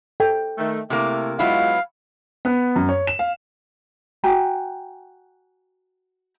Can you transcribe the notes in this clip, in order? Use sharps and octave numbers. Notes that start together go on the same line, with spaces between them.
A4 G5
D#3 A3
C3 A3 A#3 E4
F#3 G#3 B3 E4 F4 F5
B3
F#2
C#5
E7
F5
F#4 G5 G#5 A#5